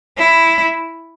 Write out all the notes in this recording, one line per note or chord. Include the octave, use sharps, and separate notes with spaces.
E4